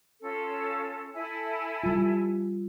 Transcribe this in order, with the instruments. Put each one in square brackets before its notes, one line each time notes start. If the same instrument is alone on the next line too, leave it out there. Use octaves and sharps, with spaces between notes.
[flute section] C#4 F4 A4
E4 A4 G#5
[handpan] G3 F4